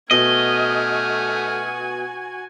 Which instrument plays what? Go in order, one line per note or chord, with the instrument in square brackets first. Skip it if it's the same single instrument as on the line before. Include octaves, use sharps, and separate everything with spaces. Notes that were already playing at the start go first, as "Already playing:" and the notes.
[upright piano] B2 [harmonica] A3 F6 [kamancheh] F#4 G#5 [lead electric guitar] D#5